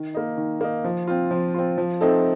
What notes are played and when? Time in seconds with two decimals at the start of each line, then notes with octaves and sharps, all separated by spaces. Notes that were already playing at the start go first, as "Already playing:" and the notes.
Already playing: D#3
0.14 A#3 D#4
0.37 D#3
0.61 A#3 D#4
0.84 F3
1.07 C4 F4
1.31 F3
1.54 C4 F4
1.78 F3
2.01 A3 C4 D#4 A4